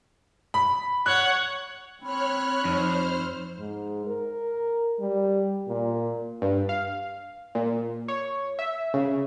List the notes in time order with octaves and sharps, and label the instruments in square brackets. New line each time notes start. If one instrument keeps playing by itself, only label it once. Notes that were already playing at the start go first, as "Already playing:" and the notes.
[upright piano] B5
[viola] C#5 F#5 [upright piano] F#6
[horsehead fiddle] C4 [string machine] C#5 F6 F#6 [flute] B5
[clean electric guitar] F2 [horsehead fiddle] D#4 [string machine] C5 F6
[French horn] G#2
A#4
G3
A#2
[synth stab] G2
F5
A#2
C#5
E5
C#3